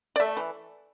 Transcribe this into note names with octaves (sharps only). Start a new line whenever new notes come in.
D5
A3 E5
E3